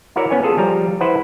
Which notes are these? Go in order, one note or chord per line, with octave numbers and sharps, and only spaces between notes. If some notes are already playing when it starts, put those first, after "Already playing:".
E4 F#4 A#4 C#5 D5 E5
B3 C#4 C#5 G#5
F4 G#4 A4
F3 G3 A#5
E4 B4 C5 F#5